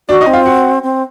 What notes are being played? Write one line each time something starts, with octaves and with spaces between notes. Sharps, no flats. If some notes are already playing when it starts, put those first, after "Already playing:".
D4 F#4 D5
D#4 D#5
C4
F4 F5
F#4 F#5
C4